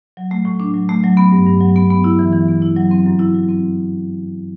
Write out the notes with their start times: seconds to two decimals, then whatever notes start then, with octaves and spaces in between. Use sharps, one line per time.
0.17 F#3
0.31 A3
0.45 A2
0.60 D4
0.74 F#3
0.89 A3
1.04 F#3
1.17 B3
1.32 G2
1.46 G2
1.61 F#3
1.76 B3
1.90 B3
2.04 E4
2.19 E3
2.33 E3
2.48 B3
2.62 E4
2.77 F#3
2.91 C4
3.06 F#2
3.19 E4
3.34 F#3
3.49 C4